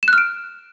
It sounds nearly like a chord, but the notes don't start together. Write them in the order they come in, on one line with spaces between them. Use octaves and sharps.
E7 F#6 F6 D7